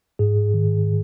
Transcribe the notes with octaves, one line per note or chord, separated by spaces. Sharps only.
G#2 G#4
D#3